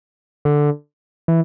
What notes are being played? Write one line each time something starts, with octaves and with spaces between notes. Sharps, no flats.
D3
E3